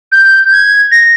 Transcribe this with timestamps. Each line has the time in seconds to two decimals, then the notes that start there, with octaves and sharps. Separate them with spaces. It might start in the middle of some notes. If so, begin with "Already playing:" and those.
0.12 G6
0.52 G#6
0.91 A#6